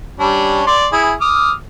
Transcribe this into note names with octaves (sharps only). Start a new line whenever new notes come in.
G3 C#4 D4
D5 C6
E4 G#4
D6 D#6 F6